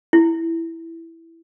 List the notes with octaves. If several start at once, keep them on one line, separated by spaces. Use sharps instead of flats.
E4